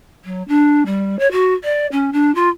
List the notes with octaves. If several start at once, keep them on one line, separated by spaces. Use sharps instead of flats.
F#3
D4
G3
C#5
F#4
D5
C#4
D4
F4